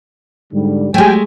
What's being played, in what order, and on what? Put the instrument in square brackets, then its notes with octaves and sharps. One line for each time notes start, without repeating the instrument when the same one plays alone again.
[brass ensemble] G#2 D3 G3
[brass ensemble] F#3 G4 [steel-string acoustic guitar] G#3 A3 [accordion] G5 G#5